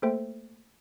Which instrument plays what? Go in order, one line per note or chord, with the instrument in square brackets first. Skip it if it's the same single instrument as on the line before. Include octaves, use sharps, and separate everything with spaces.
[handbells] A3 A#3 A4 C5 E5 G5